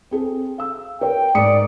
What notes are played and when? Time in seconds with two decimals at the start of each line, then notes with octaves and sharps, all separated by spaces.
0.11 C4 G#4 A4
0.58 F5 E6
1.01 A#4 C#5 G5
1.35 G#2 D5 D#6 C#7